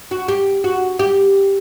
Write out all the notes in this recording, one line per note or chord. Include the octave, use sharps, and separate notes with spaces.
F#4
G4
F#4
G4